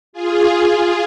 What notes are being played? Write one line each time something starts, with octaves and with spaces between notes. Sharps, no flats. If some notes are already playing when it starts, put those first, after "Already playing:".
F4 G#4
F4 G#4